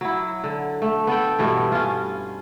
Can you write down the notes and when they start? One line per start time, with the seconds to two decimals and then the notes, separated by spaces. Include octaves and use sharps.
0.01 F#3 E4
0.44 D3
0.82 A3
1.07 B3 A4 G5
1.39 G2 B2 E3 A3
1.72 C#4 F4